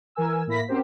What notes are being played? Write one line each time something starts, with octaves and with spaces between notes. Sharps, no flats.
E3 A#4 G#5 E6
A2 A#3 E4 B5 A#6 B6
C4 C#4 F#4 G4 A#4 C5